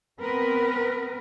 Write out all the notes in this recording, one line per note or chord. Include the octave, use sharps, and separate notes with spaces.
B3 C4 A#4 B4